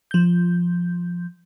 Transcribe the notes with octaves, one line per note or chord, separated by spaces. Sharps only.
F3 G6